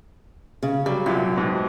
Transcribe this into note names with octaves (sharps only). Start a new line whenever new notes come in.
C#3
F#3 G3
C2 F#2 A#2 G4
G#2 B2